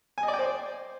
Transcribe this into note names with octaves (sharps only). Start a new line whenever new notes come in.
G#5
D#5
D5
G5
C5